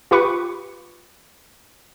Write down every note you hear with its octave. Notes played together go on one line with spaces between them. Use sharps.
F4 G4 B4 C#6